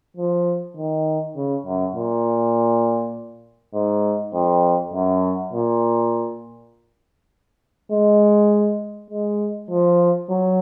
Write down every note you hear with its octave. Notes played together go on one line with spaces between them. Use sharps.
F3
D#3
C#3
F#2
A#2
G#2
F2
F#2
A#2
G#3
G#3
F3
F#3